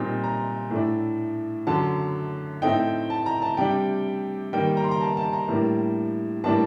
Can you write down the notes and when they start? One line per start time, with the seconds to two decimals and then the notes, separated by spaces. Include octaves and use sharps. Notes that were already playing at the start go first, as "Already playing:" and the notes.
Already playing: A#2 G3 C4 D#4
0.24 A#5
0.71 A2 A3 D4
1.67 F#2 D3 F#3 A5
2.62 A2 A3 C4 D#4 G5
3.10 A5
3.26 A#5
3.42 A5
3.57 C3 G3 D4 G5
4.53 D#3 G3 A#3 G5
4.77 A#5
4.84 C6
4.91 A#5
5.01 A5
5.17 A5
5.33 A#5
5.49 A2 G3 A#3 D4
6.44 A2 G3 A#3 D4 A5